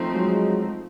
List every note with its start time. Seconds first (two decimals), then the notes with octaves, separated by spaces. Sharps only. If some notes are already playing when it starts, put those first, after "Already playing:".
Already playing: F3 A3 C4 D#4
0.12 F#3 G#3